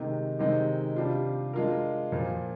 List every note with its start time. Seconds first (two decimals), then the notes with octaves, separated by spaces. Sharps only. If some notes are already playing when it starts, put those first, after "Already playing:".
Already playing: C3 D#3 G#3
0.39 C3 D#3 G#3 C4 D#4
0.96 C3 G3 D4 F4
1.53 G#3 D4 F4 A#4
2.12 A#2 F3 A#3